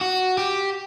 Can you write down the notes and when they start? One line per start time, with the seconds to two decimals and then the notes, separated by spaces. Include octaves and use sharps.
0.01 F#4
0.38 G4